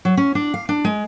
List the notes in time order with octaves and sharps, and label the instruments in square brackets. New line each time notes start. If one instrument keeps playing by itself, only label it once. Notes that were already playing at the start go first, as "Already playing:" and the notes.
[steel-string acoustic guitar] F#3
C#4
D4
F5
D4
G#3